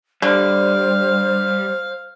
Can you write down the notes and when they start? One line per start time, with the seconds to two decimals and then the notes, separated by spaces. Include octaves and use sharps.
0.22 D3 G3 C5 F5